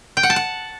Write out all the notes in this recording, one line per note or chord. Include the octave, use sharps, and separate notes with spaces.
G5
F#5
A5
F#5